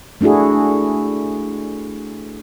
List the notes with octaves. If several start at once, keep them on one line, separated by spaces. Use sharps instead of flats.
A3 D4 E4 F#4 G#4